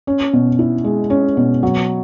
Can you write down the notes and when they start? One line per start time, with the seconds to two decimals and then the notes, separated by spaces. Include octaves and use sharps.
0.07 C#4
0.33 B2
0.59 E4
0.84 G#3
1.10 C#4
1.37 B2
1.63 F#3